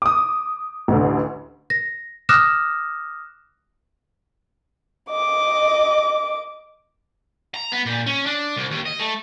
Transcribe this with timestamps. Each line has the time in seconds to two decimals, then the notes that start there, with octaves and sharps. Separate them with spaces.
0.02 D6 D#6
0.88 A1 D2 D3
1.70 A#6
2.29 D6 D#6 F6 F#6 A#6 E7
5.10 D#5 D6
7.54 A#5
7.72 B3
7.86 A#2
8.06 C#4
8.26 D4
8.56 C2
8.71 D#2
8.85 D#5
8.99 A3